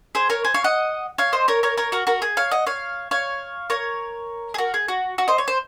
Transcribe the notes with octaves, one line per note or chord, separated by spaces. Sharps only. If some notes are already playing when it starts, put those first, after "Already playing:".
G#4 C5
A#4 C#5
G#4 C5
C#5 F5
D#5 F#5
C#5 F5
C5 D#5
A#4 C#5
A#4 C#5
A#4 C#5
F#4 A#4
F#4 A#4
G#4
C#5 F5
D#5 F#5
C#5 F5
C#5 F5
A#4 C#5
G#4
F#4 A#4
G#4
F#4
F#4
C5 D#5
C#5
C5